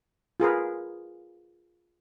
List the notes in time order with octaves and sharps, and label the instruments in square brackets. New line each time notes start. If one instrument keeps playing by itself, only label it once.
[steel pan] F4 G#4 A#4 B4